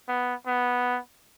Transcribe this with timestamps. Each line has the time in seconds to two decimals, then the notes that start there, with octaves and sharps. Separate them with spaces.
0.08 B3
0.47 B3